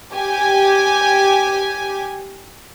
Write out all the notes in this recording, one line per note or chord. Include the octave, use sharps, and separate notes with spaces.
G4 G#5